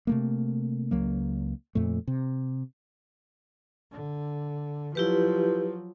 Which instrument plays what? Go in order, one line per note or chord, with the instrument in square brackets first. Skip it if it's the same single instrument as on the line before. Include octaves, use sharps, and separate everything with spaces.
[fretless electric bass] C3 A3 A#3
C#2 F#3 A#3
F2 A#2 A3
C3
[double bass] D3
[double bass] F3 F#3 [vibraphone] E4 G4 B4